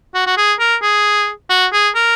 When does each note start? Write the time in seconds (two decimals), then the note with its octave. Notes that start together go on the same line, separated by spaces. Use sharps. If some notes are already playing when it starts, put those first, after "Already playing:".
0.15 F#4
0.27 F#4
0.37 G#4
0.60 A#4
0.83 G#4
1.50 F#4
1.73 G#4
1.96 A#4